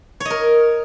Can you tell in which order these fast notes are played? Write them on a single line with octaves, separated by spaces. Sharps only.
C#5 D#5 A#4